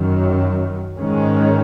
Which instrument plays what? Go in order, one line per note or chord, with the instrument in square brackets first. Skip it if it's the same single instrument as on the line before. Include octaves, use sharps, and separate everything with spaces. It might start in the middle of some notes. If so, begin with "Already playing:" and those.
Already playing: [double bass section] F#2 D#3 F#3
G#2 D#3 G#3 C#4